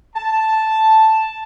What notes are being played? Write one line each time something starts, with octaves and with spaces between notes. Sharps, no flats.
A5